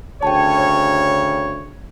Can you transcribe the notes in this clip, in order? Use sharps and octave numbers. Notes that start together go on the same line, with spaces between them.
D2 C#3 C#5 G5 A5